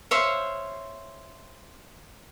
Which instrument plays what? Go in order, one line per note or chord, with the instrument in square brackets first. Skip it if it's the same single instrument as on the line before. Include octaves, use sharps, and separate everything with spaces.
[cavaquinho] C5 C#5 E5 F5